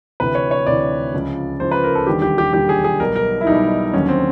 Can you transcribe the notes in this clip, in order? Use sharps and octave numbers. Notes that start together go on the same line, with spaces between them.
D2 C3 E3 B4
C#5
C#5
D2 C3 E3 D5
C#2 C#3 F3
C#2 C#3 F3 C5
B4
A#4
A4
E1 D#2 D3 G3 G4
G4
G4
E1 D#2 D3 G3 G4
G#4
G#4
B1 B2 G3 A#4
A#4
E4
B1 B2 G3 D#4
D#2 D3 F#3 C#4
C4